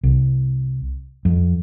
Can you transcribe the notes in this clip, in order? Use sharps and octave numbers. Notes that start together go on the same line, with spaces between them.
C2
F2